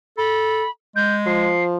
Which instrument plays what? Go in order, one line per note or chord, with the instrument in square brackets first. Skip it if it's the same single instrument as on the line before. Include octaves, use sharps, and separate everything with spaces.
[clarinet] A4 [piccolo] B5
[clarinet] G#3 [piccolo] G6
[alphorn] F3 [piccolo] C7